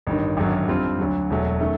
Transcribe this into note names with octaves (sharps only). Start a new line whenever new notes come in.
A1 G2 D#3
G#1 F#2 D3 F#3
F2 D3 G3 C4 F4
D2 D3 F#3
E1 E2 B2 F#3 A3
D#3 F#3 A3 C#4